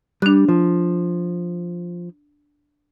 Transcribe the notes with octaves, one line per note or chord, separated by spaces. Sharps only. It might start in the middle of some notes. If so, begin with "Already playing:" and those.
G3 D4 F#6
F3